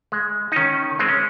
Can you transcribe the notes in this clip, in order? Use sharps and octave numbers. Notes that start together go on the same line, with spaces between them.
G#3
D#4
D#3 C#4
G#3 C4
C#4